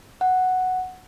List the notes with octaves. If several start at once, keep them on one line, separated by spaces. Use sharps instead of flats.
F#5